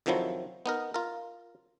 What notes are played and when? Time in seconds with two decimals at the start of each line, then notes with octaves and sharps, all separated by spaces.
0.06 F2 C3 D#3 F3 F#3 E4
0.66 B3 D#4 A#4
0.94 F4 A#4